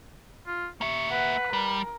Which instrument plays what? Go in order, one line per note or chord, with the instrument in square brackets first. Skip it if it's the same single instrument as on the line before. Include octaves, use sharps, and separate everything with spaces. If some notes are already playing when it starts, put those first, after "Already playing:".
[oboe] F4
[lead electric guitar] A#3 E5 [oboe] C#6
[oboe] B4 [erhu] F#5
[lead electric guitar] G3 [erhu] A#4